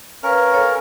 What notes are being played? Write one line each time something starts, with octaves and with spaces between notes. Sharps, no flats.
C#4 A#4 B4 F5
A4 C#5 A#5